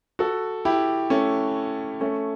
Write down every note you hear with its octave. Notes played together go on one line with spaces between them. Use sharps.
F#4 A4
E4 G4
A3 C#4
A3 C#4